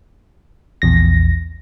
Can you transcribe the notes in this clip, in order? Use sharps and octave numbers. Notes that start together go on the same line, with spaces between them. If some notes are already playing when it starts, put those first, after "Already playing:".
A#1 E2 A#6